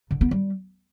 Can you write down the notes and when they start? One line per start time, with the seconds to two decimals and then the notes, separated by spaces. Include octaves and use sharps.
0.11 D3
0.21 B3
0.31 G3